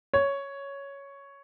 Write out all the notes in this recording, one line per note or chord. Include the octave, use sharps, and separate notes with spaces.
C#5